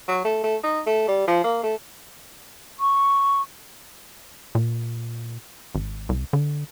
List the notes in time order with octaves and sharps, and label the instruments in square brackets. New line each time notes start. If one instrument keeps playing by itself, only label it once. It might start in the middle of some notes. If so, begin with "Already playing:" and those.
[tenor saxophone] F#3
A3
A3
D#4
A3
G3
F3
A#3
A3
[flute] C#6
[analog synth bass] A#2
G#1
C2
D3